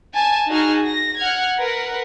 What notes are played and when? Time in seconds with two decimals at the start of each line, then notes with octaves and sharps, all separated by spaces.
0.13 G#5 A5
0.50 D#4 F#4 G#4 G#5 A5 F6
0.84 A#6
1.18 F#5 F6 G#6
1.58 A#4 B4 F#5